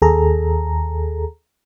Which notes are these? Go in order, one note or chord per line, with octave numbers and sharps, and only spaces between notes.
D#2 G#4 A4 A#5